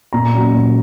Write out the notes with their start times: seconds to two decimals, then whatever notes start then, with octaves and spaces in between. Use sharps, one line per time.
0.13 A#2 A#5
0.34 F#3 C#4
0.54 A#2